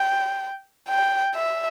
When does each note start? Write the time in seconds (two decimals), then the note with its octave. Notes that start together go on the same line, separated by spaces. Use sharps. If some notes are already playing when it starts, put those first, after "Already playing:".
Already playing: G5
0.89 G5
1.35 E5